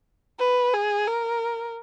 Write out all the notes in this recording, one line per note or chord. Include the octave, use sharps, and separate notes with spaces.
B4
G#4
A#4